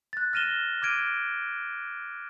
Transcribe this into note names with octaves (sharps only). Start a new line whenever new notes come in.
F#6 A6
F6 A#6 D#7 E7 G7
D6 F6 G#6 D7 D#7